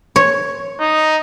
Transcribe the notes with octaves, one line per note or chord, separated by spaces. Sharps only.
C#5
D#4